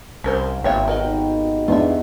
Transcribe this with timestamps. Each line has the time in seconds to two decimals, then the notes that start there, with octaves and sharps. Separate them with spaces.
0.24 C2 C#4 A#4 C5
0.64 G#1 A#3 B3 F4 C#5 E5 G5
0.88 D#4 F#4 G4 A#4 B4 D#5
1.68 E2 D4 F4 F#4 E5